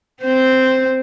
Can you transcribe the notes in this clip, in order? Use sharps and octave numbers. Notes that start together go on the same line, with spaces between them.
C4 C5